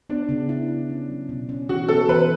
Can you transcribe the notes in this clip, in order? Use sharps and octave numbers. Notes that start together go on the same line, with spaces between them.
B3 D4
C#3
E4
E4
C#4
F#3
B2
C#4
E3 F#4
B3 A4
E3 B4